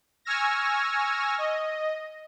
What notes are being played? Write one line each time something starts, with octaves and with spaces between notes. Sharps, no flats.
G#5 C#6 E6 F6 G#6 A#6
D#5